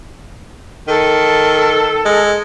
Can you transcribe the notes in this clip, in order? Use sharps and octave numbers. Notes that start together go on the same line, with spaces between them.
D#3 A4
G#3